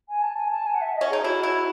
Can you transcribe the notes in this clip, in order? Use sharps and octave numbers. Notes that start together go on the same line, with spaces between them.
G#5
A5
G#5
A5
G#5
F#5
E5
D#5
C#4
D#4 G#4
E4 F#4
E4